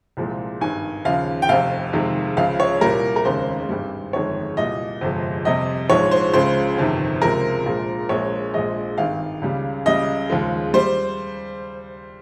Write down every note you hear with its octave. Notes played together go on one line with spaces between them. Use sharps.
C2 A#2 F3 G#3
G#1 G2 D#3 G#5
D#2 C#3 F3 F5
G5
F1 F2 C3 F5
F2 C3 D#3 G#3
C#2 C#3 F3 F5
C#5
C2 A#2 G3 A#4
A#4
F1 D#2 C#3 G#3 C5
G#1 G2 G3
G1 F2 D#3 G#3 C#5
C2 A#2 G3 D#5
G1 F2 C3 F3 G#3
F2 C3 G3 D#5
A#1 G#2 F3 G#3 C#5
C5
C#2 C#3 F3 G#3 C5
G1 F2 C3 D#3
C#2 C3 F3 G#3 A#4
A#1 A#2 F3 G#3
A#1 A#2 G#3 C#5
A#1 A#2 F3 G#3 D#5
G#1 G2 D#3 F5
C#2 C#3 G3
C#2 C#3 G3 D#5
D#2 C#3 F3 G#3
G3 C5